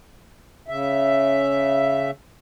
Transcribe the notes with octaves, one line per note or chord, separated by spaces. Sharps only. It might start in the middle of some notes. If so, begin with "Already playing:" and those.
C#3 E5